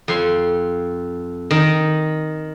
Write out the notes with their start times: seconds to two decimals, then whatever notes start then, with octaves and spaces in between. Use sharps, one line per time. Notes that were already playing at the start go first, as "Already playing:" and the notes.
0.08 F2 C6
1.51 D#3